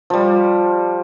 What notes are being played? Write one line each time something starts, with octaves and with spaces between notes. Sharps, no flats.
F3 G3